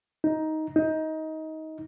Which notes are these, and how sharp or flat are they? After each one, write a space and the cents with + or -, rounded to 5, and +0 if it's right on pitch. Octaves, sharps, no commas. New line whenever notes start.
D#4 +10
D#4 +20